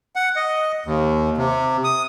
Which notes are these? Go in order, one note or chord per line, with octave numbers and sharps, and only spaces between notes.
F#5
D#5
D#2
C3
D#6